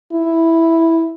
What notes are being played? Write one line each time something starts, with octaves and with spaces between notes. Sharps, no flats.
E4